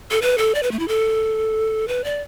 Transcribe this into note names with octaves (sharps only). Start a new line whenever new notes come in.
A4
B4
A4
D5
B4
A3
E4
A4
B4
D5